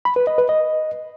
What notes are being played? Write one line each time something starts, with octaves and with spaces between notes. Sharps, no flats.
B5
B4
D#5
B4
D#5